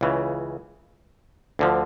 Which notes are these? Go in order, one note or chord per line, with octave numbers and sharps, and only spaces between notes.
C#2 C#3 E3
D2 D3 F3